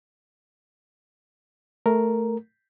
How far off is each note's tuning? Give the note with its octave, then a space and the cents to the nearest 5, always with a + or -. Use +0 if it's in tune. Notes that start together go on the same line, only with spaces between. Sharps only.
A3 +0 A#4 +0